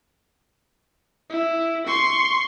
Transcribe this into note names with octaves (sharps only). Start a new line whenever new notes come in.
E4
C6 C#6